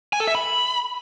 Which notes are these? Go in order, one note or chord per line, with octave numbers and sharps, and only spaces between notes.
G#5
A4
E5
B5